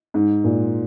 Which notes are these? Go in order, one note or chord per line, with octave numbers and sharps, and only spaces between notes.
G#2
A#2